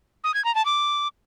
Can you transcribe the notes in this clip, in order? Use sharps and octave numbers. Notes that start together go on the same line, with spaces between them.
D#6
G#6
A#5
A5
D6